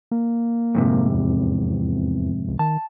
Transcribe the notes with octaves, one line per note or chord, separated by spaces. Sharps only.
A#3
F2 G#2 C3
E2
C#2
D#3 A5